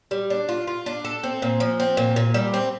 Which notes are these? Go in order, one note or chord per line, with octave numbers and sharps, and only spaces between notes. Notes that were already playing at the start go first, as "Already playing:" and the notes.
G3
D4
F4
F4
D4
A4
C4
A#2
F3
C4
A#2
A#2
G3
C4